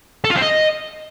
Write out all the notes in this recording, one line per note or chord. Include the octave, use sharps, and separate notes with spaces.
A4
F4
C4
D#5